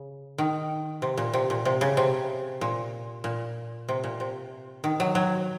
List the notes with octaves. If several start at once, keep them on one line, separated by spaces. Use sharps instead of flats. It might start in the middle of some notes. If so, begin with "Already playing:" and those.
Already playing: C#3
D#3
C3
A#2
C3
A#2
C3
C#3
C3
A#2
A#2
C3
A#2
C3
D#3
F#3
F#3